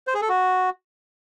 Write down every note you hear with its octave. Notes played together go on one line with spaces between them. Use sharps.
C5
G#4
A4
F#4